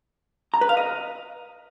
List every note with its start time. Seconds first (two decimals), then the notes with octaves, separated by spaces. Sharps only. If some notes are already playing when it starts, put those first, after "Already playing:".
0.54 A#5
0.61 B4
0.69 F5
0.77 D#5